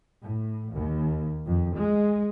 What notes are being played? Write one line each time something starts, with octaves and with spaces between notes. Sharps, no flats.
A2
D#2
F2
G#3